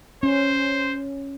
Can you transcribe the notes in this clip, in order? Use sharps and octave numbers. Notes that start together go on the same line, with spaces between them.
C#4 C5